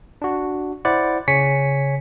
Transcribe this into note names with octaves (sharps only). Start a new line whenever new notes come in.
D4 F#4
E4 C5 D5 F#5
C#3 C#5 G#5 B6 C#7